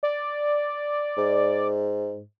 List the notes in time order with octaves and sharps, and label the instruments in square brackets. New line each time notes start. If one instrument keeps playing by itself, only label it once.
[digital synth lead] D5
[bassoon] G#2